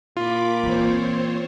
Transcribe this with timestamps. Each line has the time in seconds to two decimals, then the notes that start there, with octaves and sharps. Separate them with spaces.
0.17 A#2 F4 B5 D6
0.63 E3 A#3 C4 C5 C#5